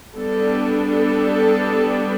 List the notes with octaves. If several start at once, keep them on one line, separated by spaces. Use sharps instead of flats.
G3 B3 D4 A4
A4